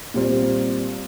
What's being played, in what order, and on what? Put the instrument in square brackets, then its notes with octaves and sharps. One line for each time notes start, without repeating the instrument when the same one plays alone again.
[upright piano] A#2 G3 C4